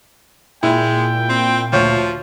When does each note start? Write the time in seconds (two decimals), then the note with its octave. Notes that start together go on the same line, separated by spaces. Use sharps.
0.63 A#2 G#3 E4 G5
1.29 C4
1.73 D2 F3 C#5 G6